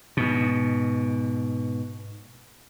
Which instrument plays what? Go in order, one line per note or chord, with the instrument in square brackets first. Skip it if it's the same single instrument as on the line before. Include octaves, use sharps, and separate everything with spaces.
[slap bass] G#2 B2